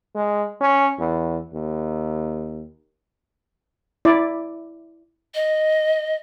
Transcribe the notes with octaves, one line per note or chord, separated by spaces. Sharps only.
G#3
C#4
E2
D#2
E4 D5
D#5